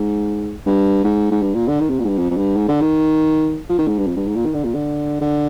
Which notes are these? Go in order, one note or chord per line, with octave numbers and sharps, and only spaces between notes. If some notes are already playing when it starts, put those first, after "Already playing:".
Already playing: G#2
G2
G#2
G#2
G2
A#2
D3
D#3
C3
A#2
G#2
G2
F2
F2
G2
G#2
D3
D#3
F3
D#3
G#2
G2
F2
G2
G#2
A#2
D#3
D3
A#2
D3
D3